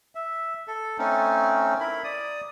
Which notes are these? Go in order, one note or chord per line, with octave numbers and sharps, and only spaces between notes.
E5
A4
A3 C4 C#4 D#4
E4 A#4 B5
D5 D#6